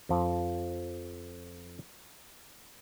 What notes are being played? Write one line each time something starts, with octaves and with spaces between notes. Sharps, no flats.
F2 F3